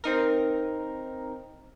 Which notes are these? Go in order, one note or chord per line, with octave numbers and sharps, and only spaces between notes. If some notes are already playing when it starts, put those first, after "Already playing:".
C4 D#4 A#4